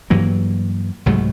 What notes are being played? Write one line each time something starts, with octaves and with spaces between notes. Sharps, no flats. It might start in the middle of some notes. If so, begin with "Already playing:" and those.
G2 E3 F#3 A#3
C2 G#2 F#3 A3